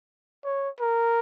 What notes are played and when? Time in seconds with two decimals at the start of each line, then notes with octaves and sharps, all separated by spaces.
0.44 C#5
0.80 A#4